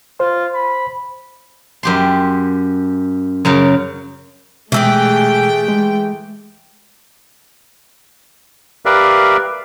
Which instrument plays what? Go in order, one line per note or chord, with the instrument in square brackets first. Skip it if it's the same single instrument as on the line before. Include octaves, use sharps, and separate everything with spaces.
[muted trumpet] F4 [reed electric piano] C5
[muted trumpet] B5
[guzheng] F#2 G4 C6
F#2 C#3 A#4
[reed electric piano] B2 G#3 E6 [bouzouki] E3 G4 G#4 [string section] A3 G5
[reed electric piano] G#3
[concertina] G4 A#4 B4 D5 E5 F5